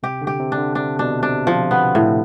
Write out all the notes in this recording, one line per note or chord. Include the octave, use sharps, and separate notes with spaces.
C3 G4
D3
G4
C3
D4
D3
C3 D4
B2 D4
C3 D4
F3
B3
A2